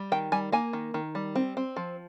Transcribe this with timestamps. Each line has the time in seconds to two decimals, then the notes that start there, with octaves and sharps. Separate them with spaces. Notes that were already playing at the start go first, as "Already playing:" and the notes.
Already playing: G3
0.12 D#3 G5
0.32 G3 G#5
0.52 A#3 G#5
0.73 D#3
0.94 D#3
1.15 G3
1.35 C4
1.57 C4
1.76 F3